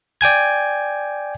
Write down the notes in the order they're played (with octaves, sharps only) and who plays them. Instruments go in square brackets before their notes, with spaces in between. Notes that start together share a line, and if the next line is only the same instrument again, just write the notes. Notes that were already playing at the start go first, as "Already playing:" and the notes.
[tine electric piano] D5 G5 G#5 G#6